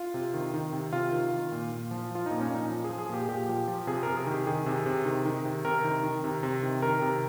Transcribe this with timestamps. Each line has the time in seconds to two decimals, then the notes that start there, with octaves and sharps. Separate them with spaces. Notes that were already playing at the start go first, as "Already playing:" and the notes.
Already playing: F4
0.14 C3
0.34 D#3
0.54 D#3
0.73 C3
0.93 C3 F4
1.12 D#3
1.32 D#3
1.52 A#2
1.72 A#2
1.91 F3
2.11 F3 F4
2.26 A#2 D#4
2.41 C#4
2.49 A#2 D#4
2.70 F3
2.84 F3 G#4
2.98 G#4
3.09 A#2 G4
3.28 A#2 G4
3.49 F3
3.68 F3
3.87 C3 G#4
4.03 C3 A#4
4.17 G#4
4.27 D#3 G4
4.47 D#3 G#4
4.66 C3
4.86 C3
5.05 D#3
5.25 D#3
5.45 C3
5.65 C3 A#4
5.84 D#3
6.03 D#3
6.24 C3
6.43 C3
6.63 D#3
6.82 D#3 A#4
7.02 C3